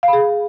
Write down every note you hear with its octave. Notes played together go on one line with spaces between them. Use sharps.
F5
B5
G#4